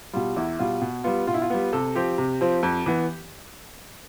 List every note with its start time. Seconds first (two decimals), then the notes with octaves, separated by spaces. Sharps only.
0.13 B2 G3 F4
0.36 E2 E4
0.59 B2 G3 F4
0.82 B2
1.04 G3 B3 F4
1.27 B2 F4
1.34 E4
1.42 F4
1.50 G3 B3
1.73 C3 A4
1.95 F3 C4 G4
2.18 C3
2.41 F3 C4
2.63 F2
2.86 E3 B3